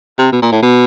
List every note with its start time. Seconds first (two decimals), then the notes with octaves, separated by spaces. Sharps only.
0.19 C3
0.32 B2
0.42 A#2
0.52 A2
0.62 B2